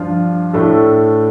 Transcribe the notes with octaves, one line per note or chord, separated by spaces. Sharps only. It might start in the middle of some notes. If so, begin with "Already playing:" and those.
Already playing: G2 F3 D4 F4
A2 A3 D4 A4